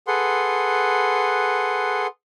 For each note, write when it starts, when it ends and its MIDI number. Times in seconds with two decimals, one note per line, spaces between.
0.08 2.07 68
0.08 2.07 69
0.08 2.07 71
0.08 2.07 78
0.08 2.07 84